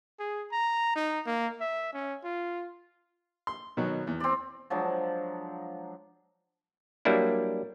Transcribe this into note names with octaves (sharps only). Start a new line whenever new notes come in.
G#4
A#5
D#4
A#3
E5
C#4
F4
C6
B2 D#3 F#3
E2
C4 D5
F3 F#3 G#3 D4
F#3 G3 A#3 D4 E4